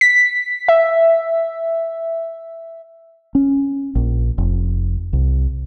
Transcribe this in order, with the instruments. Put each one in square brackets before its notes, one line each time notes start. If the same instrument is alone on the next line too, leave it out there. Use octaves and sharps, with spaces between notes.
[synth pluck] B6
E5
[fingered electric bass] C#4
A#1
F1
C2